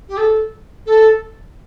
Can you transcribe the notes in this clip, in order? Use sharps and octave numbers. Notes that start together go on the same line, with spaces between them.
G4
A4
A4